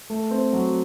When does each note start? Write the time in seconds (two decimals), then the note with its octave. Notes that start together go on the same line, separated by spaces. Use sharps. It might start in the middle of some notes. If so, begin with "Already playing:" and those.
0.10 A3
0.31 C4
0.53 F#3